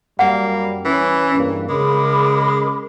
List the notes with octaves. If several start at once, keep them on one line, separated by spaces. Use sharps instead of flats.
F#2 G3 A#3 F#5
E3 C#4
E2 G2 A#3
C#3 G#3 A#4 B5 D6